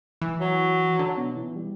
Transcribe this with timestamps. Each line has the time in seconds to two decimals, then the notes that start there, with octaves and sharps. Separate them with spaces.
0.21 E3
0.41 F#3
0.99 D3
1.17 B2
1.37 E3
1.56 G3